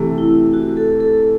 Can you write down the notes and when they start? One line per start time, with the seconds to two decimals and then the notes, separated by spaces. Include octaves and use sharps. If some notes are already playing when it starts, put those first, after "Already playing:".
Already playing: C3 E3 A3
0.18 E4
0.53 F#4
0.77 A4
1.00 A4